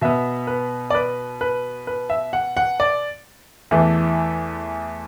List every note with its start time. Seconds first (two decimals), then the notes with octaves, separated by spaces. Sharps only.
0.01 B2 B3 E5
0.47 B4
0.90 D5
0.95 B4
1.41 B4
1.87 B4
2.10 E5
2.33 F#5
2.57 F#5
2.80 D5
3.71 E2 E3 A3